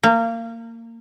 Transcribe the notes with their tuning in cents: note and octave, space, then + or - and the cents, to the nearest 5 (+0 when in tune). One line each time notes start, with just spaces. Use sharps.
A#3 -25